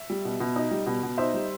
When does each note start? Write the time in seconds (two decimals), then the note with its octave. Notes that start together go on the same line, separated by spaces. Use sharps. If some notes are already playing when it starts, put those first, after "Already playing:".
Already playing: E5
0.10 G3
0.25 B2
0.40 B2
0.56 D#4
0.71 G3
0.86 B2
1.03 B2
1.18 D#4 C5 E5
1.34 G3